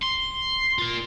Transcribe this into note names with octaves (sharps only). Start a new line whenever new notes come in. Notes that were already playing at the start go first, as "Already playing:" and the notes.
C6
F4 A#4